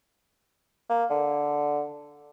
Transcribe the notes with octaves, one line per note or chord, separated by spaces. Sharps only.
A#3
D3